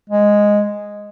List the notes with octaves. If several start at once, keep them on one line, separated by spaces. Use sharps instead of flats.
G#3